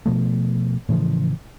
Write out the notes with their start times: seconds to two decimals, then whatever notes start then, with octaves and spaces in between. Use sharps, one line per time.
0.06 B2 F3 A3
0.89 A2 C#3 E3 F3